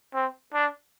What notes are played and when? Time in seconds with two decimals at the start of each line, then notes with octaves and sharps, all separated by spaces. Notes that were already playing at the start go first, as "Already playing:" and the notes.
0.14 C4
0.54 D4